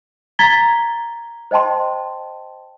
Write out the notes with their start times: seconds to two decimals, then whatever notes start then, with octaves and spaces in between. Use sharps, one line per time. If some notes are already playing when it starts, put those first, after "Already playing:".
0.39 A#5 G#6 A6 B6 G7
1.51 C5 D#5 G5 A5 C6